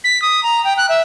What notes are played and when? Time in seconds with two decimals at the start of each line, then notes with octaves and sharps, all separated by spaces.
0.04 B6
0.22 D#6
0.43 A#5
0.65 G5
0.78 F#6
0.89 E5